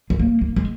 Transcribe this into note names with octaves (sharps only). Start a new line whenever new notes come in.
G#3
A#3
A#3
G#3